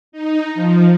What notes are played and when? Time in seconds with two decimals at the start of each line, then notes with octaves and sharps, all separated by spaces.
0.12 D#4
0.55 F3